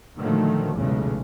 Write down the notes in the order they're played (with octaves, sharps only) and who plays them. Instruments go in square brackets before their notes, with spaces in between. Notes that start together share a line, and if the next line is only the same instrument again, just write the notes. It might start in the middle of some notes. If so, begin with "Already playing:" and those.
[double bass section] A#2 D3 D#3 F3 F#3 A3
B1 E2 A#2 C#3 G#3 A3